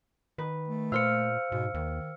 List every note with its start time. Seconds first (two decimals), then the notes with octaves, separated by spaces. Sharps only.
0.38 D#3 B4
0.68 A3
0.92 A#2 C5 F5 E6 F6 C#7
1.52 G#2 B2
1.74 D#2 D#3